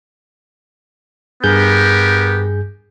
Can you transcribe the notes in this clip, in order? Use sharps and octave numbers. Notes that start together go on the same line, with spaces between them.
G2 B3 G4 G#4 A#4 G6